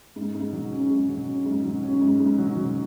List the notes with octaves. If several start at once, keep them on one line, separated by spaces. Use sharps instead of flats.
G#2
G#2
F#3
C#4
G#2
F#3
C#4
G#2
F#3
C#4
G#2
G#2
F#3
F#3